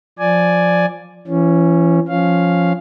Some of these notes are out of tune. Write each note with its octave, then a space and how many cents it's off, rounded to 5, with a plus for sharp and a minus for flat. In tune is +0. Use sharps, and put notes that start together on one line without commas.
F3 +10 D5 +0 G#5 +5
E3 +35 C#4 +0
F3 +0 C#4 +0 F5 +0